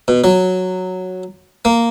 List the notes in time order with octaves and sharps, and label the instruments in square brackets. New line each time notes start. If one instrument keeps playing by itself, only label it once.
[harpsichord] B2
F#3
A#3